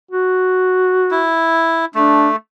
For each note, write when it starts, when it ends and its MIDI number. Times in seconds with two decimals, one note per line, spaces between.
0.11 1.29 66
1.11 1.85 64
1.95 2.36 57
1.95 2.29 62